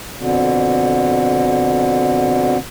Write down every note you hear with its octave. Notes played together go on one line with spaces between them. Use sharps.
F2 B2 D3